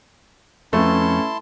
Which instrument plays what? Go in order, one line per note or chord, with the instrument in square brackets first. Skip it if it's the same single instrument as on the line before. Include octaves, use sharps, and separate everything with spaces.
[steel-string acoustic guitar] F2 [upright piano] A3 B4 [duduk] C#4 [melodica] E4 A5 C6